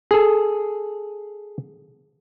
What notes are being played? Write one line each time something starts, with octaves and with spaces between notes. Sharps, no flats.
G#4 A4